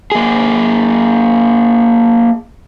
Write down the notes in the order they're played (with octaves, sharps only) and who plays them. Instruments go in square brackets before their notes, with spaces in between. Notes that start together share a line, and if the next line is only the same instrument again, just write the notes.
[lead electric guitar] A#3 G#4